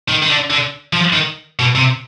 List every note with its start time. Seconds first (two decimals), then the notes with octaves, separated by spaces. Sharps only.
0.09 D#3
0.23 D#3
0.30 D3
0.50 D3
0.93 F3
1.13 D#3
1.59 B2
1.75 C3